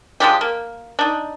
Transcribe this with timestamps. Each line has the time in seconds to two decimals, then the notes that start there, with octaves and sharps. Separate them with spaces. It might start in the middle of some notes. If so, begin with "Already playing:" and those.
0.20 F3 G#3 D4 G4
0.41 A#3
0.99 D4 D#4